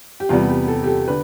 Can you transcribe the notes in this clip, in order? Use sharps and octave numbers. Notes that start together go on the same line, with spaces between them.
G4
E2 C3 G3 B3 F4
G4
A4
G4
A4
D3 B4